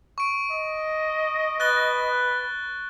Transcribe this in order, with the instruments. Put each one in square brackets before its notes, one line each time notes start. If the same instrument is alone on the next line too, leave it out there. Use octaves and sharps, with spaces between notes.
[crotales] C#6 D7
[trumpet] D#5
[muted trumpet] B4 [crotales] F#6 A6 G7